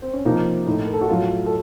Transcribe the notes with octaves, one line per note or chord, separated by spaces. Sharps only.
C4
C#4
C3 F3 A#3 D#4
A2 A3 D#4
A#4
A4
F#4
A2 F#3 A3 F4
A4